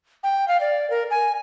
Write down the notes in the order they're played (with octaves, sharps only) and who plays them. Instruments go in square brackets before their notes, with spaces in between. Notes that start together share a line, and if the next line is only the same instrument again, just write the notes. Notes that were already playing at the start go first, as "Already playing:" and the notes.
[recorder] G5
F5
D5
A#4
G#5